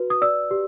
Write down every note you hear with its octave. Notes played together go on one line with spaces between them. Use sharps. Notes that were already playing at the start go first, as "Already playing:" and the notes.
Already playing: F#4 B4
D#6
D5 E6
G4